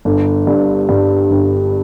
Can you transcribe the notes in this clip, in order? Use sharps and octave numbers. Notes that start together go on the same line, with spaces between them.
G1
G2
G2
G1